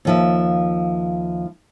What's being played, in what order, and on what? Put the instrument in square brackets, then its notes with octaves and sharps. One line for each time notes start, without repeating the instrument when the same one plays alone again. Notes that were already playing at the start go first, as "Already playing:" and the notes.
[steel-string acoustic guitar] D#2 F3 E5